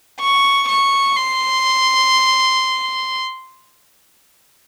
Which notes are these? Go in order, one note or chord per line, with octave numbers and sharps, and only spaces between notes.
C#6
C#6
C6